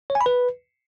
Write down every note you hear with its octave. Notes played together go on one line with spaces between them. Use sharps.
C#5
G#5
B5
B4